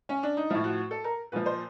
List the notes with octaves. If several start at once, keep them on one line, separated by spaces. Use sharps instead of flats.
C#4
D4
D#4
A2 F3 E4
F#4
A4
A#4
A#2 F3 B4
C5